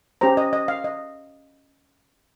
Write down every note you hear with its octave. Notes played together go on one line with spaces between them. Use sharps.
C#4 G4 C5 A#5
D#5
D#5
F5
D#5